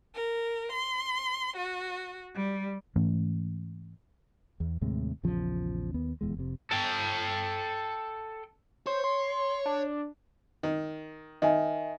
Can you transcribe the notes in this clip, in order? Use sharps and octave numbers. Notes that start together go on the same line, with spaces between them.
A#4
C6
F#4
G3
G#2 E3 A3 C#4
E2
D#2 A2 C3 G#3
A#1 E2 C#3 F3
D#2 B3
D#1 E2 G#3
F1 C3
A4 G5
C5 C#5
C6
D4
D#3
D#3 D#5 E5 G#5